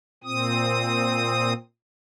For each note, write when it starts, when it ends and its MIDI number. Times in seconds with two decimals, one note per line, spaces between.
0.24 1.53 46
0.24 1.53 60
0.24 1.53 87